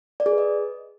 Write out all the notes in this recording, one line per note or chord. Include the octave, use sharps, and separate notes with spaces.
D5
G#4
B4
D#5